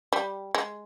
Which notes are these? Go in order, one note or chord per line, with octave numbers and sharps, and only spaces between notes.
G3
G#3